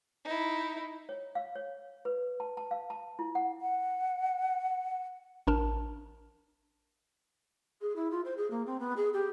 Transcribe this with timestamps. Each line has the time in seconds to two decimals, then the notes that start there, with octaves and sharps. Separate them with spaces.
0.25 D#4 E4
1.09 C#5
1.35 F5
1.56 C#5
2.05 B4
2.40 A5
2.57 A5
2.71 F5
2.90 A5
3.19 E4
3.35 F#5
3.61 F#5
5.47 A1 D4 A#4 A5
7.81 G#4
7.96 E4
8.11 F4
8.25 C5
8.37 G#4
8.51 A#3
8.66 C4
8.80 B3
8.97 G#4
9.13 G4